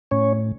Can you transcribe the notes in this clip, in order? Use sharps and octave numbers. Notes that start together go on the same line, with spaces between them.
A2 C#4 C#5